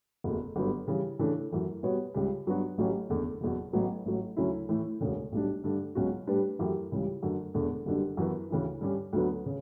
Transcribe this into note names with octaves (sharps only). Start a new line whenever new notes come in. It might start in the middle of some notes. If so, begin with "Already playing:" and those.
F#1 E2 B2 A3
G1 G2 D3 F#3 B3
C#3 E3 G3
C#3 E3 A3 D4
F#2 E3 A3
B2 G3 B3 F#4 C#5
C#2 C#3 G3
G2 F#3 B3 D4 F#4
A1 A2 F#3 C#4 G4
F#1 E2 D3 A3
F#1 E2 B2 F#3
A1 A2 F#3 B3
A1 A2 F#3
D2 C#3 F#3 C#4 E4
A2 E3 A3 E4
E1 D2 C#3
B1 A2 G3 D4
G2 D3 A3 D4
C#2 B2 F#3 C#4 F#4
A2 G3 D4 G4 B4
F#2 E3 A3 E4 G4
C#2 C#3 E3 G3
F#2 D3 A3
E1 E2 D3 A3
F#1 F#2 D3 G3 D4
F#2 E3 B3 F#4 B4
D2 C#3 E3 A3 E4
G2 D3 G3 C#4 G4
D2 D3 F#3 B3
C#3